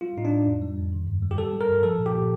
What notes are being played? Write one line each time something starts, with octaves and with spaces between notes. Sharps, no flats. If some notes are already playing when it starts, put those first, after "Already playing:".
G3 F4
A2 D#4
D4
A2
F2
G3
F2
D#3
G2
G3
G4
G3 A4
G3
A#4
G2
F3 A4
A#2
G4
A#2